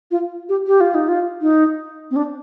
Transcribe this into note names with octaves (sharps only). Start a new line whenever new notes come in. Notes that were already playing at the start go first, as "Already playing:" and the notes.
F4
G4
G4
F4
D#4
F4
D#4
C4
D4